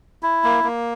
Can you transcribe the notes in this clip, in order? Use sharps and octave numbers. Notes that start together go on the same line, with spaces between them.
E4
A#3
A#3